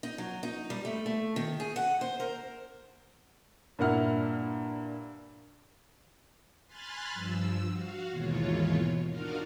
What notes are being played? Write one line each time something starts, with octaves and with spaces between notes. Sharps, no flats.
D#4
F#3
D#4
G3
A3
A3
D#3
G#4
F#5
C5
A#4
G2 A#2 A#3 E4 F#5 F6
G#5 B5 C6 F6 F#6 A6
G2 F3 E6
F#4 F5
D#2 G#2 B2 E3 F4 C#5
D4 D#4 F4 F#4 A#4 F5